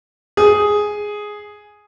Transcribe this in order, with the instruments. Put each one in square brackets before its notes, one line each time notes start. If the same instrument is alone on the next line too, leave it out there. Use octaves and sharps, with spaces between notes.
[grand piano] G#4